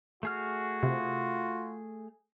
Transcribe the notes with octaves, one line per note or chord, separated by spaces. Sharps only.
A3 F#4 G#4 F6
C3 F4